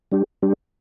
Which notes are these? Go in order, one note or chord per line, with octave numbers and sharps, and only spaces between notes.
G3 D4 G4
G3 D4 G4